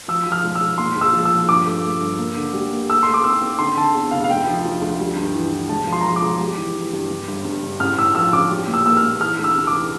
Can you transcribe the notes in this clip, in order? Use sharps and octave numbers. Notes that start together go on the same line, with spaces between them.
F3 E6
F3
F6
E1
E6
E1
A#2 C6
A#1
E6
F3
E6
F3
G2 D6
A3
A3
G1
A#3
D3
G3
A#3
A3 E6
A3 C6
D6
C4 E6
C4
D3 C6
D3 A5
E2
F1 F5
F5
D2 G5
F3
F3
D2
G3
G2
E3
E3
E1 A5
F3
C6
A#5
F3 C6
D6
E1
G3
E3
E3
G2
G2
G1
G2
G2
A1 F6
A2 E6
F3 E6
A1 D6
G3
A#2
E6
A#3 E6
F6
A#2
E3 F6
D2
E6
C3
D6
E3